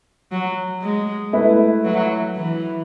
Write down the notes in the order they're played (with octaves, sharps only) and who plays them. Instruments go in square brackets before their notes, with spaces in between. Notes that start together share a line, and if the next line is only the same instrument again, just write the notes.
[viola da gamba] F#3
G#3
[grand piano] A3 E4 B4
[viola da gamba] F#3
E3